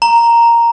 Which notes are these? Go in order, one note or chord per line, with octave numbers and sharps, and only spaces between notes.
A#5